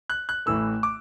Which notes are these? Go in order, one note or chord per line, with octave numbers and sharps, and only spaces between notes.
F#6
F#6
A1 A2 E3 A3 E6
D6